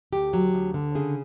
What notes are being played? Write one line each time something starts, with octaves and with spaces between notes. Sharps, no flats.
D2 G4
F#3
D2
D3
C#3 G#4